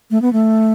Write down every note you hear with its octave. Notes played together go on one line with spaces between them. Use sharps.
A3
B3
A3